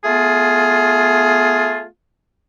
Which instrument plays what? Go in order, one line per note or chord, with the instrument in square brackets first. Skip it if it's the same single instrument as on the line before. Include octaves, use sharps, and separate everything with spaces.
[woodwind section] A3 B3 F4 G#4